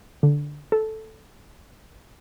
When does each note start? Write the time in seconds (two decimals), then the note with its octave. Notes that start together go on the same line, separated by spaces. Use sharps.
0.23 D3
0.72 A4